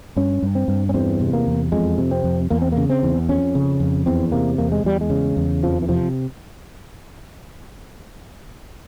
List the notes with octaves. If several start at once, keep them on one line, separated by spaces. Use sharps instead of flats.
G2 C#4
G2
C4
G2
C#4
E2 C4
C3
A#3
E2
F2 G#3
C3
C4
F2
E2 A#3
C4
C#3 A#3
C4
E2
F2 C#4
C#3
F2
E2 C4
C3 A#3
E2 A#3
G#3
E2 G3
G#3
C#3
E2
F2 F3
E3
C3 F3